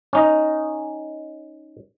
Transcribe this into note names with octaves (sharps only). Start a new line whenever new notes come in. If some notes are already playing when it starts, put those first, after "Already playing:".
C#4 D#4 D#5